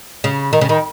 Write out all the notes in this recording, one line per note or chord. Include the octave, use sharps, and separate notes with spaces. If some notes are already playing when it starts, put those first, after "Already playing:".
C#3
D#3
C#3
D#3